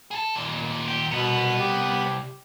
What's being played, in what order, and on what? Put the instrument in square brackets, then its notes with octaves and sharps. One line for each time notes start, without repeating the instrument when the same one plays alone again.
[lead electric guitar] G#4 A4
D#2 A#2
[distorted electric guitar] G4
[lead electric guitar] C2 [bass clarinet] B2 [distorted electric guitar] B3
[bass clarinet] G4